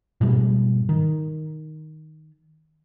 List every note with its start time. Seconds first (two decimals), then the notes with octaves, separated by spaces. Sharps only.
0.21 G#2 B2 G3
0.89 D#3